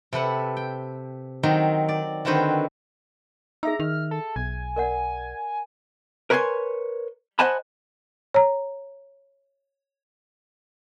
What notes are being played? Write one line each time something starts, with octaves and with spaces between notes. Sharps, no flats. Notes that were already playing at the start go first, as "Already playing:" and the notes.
C3 A4 B4 F#5
G5
D#3 F#3 C4 D#4
D5
D3 D#3 C4 F#4 B4 C5
D#4 G#4 E5 A#5 E6
D#3 F6
A4
B1 G#5
A#4 D5 F#5
A#4 B4 C#5 F5 G#5 C6
C5 D#5 F#5 G#5 A5 B5
C#5 A#5